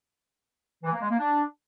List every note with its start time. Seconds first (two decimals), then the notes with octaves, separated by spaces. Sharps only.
0.84 E3
0.93 A#3
1.01 G#3
1.10 A#3
1.19 D4